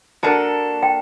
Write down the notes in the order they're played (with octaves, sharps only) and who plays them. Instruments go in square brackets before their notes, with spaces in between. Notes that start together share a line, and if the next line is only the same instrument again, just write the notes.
[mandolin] A#3 D4 F#4 A4 [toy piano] A5
[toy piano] G5